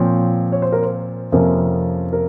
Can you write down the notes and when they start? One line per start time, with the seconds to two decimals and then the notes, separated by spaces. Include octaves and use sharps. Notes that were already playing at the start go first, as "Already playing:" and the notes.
Already playing: A#2 F3 C4 C#5
0.52 C#5
0.62 C5
0.72 A#4
0.83 C5
1.32 F2 C3 F3 A#3 C#4 A#4
2.13 A#4